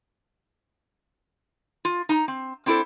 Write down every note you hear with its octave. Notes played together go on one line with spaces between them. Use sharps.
F4
D#4 A#5
C4
C4 D4 E4 G4 A4 C5